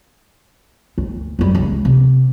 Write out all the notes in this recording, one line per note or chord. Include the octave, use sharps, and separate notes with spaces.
D2
F#2 G3
C#2
C3